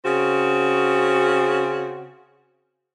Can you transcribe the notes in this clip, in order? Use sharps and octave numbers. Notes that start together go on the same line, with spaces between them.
C#3 C4 F#4